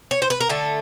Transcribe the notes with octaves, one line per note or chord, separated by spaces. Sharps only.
C#5
C5
B4
A#4
D3 A3 A4